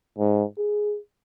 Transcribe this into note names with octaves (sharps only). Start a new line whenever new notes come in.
G#2
G#4